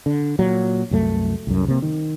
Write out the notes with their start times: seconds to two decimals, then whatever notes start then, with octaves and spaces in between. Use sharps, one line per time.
0.06 D3
0.39 A#2 F#3
0.91 C2 F#2 A3
1.47 C2 F#2
1.68 C3 A#3
1.82 D#3